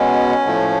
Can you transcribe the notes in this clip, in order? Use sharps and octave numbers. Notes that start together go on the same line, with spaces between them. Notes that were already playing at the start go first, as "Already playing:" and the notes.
Already playing: B2 G#3 B3 C#4
A2 F3 A3